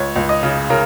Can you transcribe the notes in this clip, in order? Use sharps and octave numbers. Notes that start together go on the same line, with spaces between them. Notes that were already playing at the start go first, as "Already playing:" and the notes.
Already playing: C#2 C#5
C#2
D#5
C#3
C#3 A#4